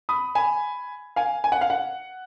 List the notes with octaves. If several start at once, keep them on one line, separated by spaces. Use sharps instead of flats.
B5 D#6
G#5 B5
F5 G#5
G#5
F#5
F5
F#5